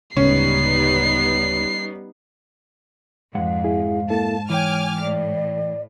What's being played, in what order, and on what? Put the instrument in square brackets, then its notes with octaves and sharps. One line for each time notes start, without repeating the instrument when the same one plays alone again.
[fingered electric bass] D1 C#3 G#3 [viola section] G3 B3 D#4 [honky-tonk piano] C#4 [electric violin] C7
[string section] F2 [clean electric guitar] G#2 G#3 F#5 [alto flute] F5
[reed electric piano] E4 G#4
[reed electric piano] A#3 E4 A4 [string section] A5
[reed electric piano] E3 G5 [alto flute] C#5 [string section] G#5 D6 F6
[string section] A2 [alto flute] D5